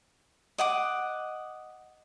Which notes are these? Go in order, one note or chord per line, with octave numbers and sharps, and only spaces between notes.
D#5 F#5 D6